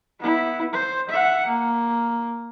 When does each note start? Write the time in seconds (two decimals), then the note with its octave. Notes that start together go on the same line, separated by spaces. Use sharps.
0.20 B3 E4
0.73 C5
1.10 E5 F#5
1.46 A#3